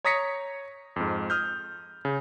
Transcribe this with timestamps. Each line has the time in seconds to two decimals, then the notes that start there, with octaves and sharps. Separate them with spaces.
0.05 C#5 A#5 D#6 A#6 B6 C#7
0.96 F2 G#2
1.30 D#6 F6 G6
2.05 C#3